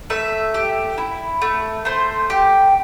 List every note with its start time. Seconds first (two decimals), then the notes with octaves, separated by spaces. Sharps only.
0.10 A3 E5
0.54 G4
0.98 E4
1.42 A3
1.85 A3 C5
2.30 G4